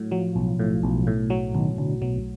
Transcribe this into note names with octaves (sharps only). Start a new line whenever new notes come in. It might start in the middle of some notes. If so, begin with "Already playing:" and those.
Already playing: A2 F#3
F3 F#3
B1
A2
B1
A2
F#3
B1 D#3
B1 D3
B2 F#3